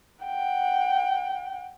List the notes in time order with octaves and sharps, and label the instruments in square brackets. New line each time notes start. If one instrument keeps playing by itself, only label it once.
[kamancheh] F#5 G5